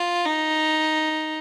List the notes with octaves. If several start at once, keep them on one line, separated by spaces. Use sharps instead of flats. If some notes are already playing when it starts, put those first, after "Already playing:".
Already playing: F4
D#4